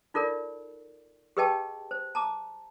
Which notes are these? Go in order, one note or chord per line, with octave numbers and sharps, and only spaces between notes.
D#4 F4 A4 A#4 D5
G4 G#4 B4 D#5 G5 A5
C5
A5 A#5 D6